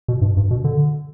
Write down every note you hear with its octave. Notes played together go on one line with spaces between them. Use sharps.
B2
G2
G2
B2
D3